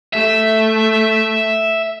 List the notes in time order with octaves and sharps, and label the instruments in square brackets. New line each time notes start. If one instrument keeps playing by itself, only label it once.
[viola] A3 [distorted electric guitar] E5